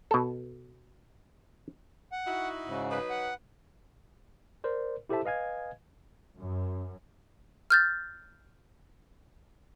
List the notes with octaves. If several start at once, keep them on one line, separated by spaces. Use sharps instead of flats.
B2 A4
F#5
D#4 E4 F#4
G#2 C#3
F#3 D#4 B4
F#5
A#4 C5 D5
E4 G4 A4 C5 E5 A5
B4 D#5 F5 G#5 G#6
F#2
F6 G6 A6